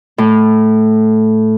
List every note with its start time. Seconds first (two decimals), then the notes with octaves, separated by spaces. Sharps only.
0.18 A2